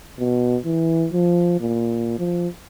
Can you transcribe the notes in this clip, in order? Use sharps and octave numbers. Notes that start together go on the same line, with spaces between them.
B2
E3
F3
A#2
F3